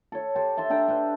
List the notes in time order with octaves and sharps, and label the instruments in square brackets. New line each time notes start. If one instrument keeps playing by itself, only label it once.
[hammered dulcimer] A4 C#5
G4 A4 C5
E5 A5 C6
D4 A4 G5 A#5
D4 B4 C5